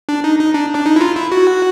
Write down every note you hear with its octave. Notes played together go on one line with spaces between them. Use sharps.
D4
D#4
D#4
D4
D4
D#4
E4
F4
E4
F#4